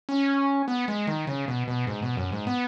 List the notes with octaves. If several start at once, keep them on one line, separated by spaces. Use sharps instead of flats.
C#4
B3
G#3
D#3
C#3
B2
B2
G#2
B2
F#2
G#2
B3